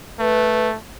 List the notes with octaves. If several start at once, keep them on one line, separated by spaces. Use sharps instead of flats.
A3 B4